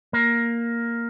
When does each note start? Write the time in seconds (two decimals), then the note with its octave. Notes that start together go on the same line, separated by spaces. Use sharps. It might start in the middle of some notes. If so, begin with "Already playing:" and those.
0.13 A#3